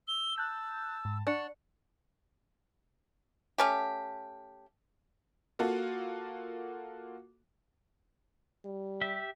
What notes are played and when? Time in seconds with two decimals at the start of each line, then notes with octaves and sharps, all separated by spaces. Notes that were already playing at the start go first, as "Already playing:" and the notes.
0.08 E6 G7
0.38 A5 F#6 G6
1.05 G#2
1.27 D4 F#5 C#6 C#7
3.58 A3 C#4 G4
5.59 A#3 F4 F#4 A4
8.65 G3
9.01 G4 E5